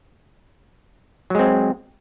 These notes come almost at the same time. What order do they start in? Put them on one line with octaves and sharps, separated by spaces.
F#3 G#3 C4